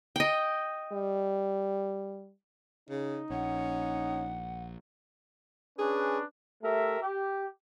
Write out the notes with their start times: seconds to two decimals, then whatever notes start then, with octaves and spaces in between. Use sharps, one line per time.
0.16 D#5 G5
0.92 G3
2.90 C#3 D#4
3.30 A#1 C#4 F#5
5.79 C#4 D4 G#4 B4
6.63 A3 G4 A#4 E5
7.01 G4